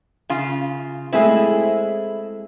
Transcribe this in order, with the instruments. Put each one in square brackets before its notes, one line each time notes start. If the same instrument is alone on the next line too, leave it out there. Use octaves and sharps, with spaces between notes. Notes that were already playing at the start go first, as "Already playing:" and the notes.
[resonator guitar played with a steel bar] C#3 F4
[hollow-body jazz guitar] G#3 A3 C4 [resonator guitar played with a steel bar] E4 G#4